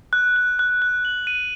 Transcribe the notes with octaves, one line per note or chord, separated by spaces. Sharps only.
F#6
F#6
F#6
F#6
F#7
D#7